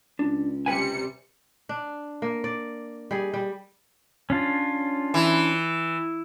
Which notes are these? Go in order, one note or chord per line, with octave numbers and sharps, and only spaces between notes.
C#2 D4
C3 G3 B4 G5 G#5 C#7
D4
A#3
D5
G3 G#4
G3
C#4 D4 F4
E3